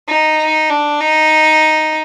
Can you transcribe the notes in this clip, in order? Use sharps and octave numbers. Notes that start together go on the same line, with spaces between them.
D#4
D4
D#4